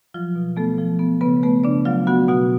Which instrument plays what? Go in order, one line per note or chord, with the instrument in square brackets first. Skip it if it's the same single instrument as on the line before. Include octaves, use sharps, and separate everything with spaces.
[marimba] F3 F#3 F4
B2
A3 B3 A4
F3
B3
C#3 B3 B4
A3 B3 B4
C#3 D4 D5
F#3 F4 F5
B3 F#4 F#5
B2 F#4 F#5